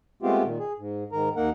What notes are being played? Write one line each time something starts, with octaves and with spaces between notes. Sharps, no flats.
G#3 A3 B3 C4 F4 G4
A#2 D#3
G#4
G#2
G#2 D#3 A#4 A#5
D#2 A#3 D#4 A#4 F#5